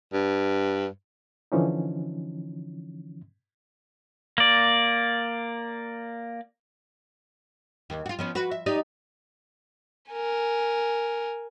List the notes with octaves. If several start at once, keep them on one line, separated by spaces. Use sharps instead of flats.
G2
D3 E3 F3 C#4 D#4
A#3 D5
D#2
F4 F#4
F3 B3 C#4
F#4 B4
E5
D#4 G4 D5
A#4 G#5